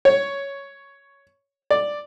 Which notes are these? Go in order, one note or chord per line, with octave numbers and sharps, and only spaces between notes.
C#5
D5